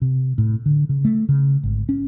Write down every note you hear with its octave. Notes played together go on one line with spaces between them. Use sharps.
C3
A2
D3
C#3
A3
C#3
G#1
C#4